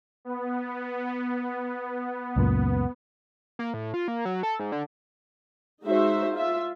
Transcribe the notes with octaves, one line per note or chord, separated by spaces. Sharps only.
B3
C#2 F#2 A#2
A#3
A2
F4
A#3
F#3
A4
G#2
D3
G#3 D#4 F#4 C5 E5
F4 E5